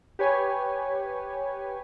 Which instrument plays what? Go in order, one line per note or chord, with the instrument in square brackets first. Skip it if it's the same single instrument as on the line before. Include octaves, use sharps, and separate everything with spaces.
[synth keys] G4 B4 C#5 G#5